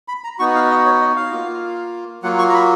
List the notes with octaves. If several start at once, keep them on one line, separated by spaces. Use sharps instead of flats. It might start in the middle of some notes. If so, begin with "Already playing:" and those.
B5
A#5
B3 D#4 F#4 C#6
F5
D#5
C#5
D#5
F5
A#3 F4
F#3 A#3 F4 F#5
C#6
A#5
B5